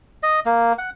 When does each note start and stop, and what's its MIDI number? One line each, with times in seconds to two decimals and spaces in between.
0.23 0.40 75
0.46 0.73 58
0.78 0.90 78